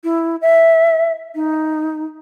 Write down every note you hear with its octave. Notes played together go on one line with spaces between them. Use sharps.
E4
E5
D#4